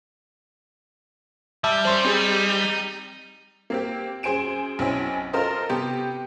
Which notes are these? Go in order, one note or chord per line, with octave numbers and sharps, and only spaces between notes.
G3 E5 A5 E6
F#3 C#4 C5 C6
C4 D#4 G4 G#4
A#3 C4 G4
F#2 G#4 C5 G#5 D7 E7
B1 C4 C#4 E4 G#5
F4 A4 A#4 C5 D#5
C3 B3 G4